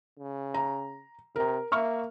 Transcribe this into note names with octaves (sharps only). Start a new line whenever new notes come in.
C#3
A#5
C3 A#4 A#5
A#3 E5 C#6 F6